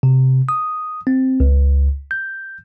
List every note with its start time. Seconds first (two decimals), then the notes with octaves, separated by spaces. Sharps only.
0.03 C3
0.49 D#6
1.07 C4
1.40 C#2
2.11 G6